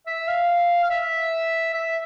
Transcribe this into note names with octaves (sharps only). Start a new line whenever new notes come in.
E5
F5
F5
E5
E5